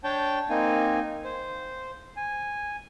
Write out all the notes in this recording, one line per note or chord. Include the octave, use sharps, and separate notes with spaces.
D4 C#5 G5 A5 G6
A#3 C4 D#4 G#5
C5
G#5